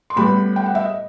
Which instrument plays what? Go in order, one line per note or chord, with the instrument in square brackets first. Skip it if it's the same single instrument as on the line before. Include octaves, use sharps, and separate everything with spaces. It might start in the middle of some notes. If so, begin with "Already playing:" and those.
[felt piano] C6
A2 G3 B3 B5
G5
F#5
E5
D#5